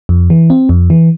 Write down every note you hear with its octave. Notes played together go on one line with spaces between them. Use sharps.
F2
E3
C4
F2
E3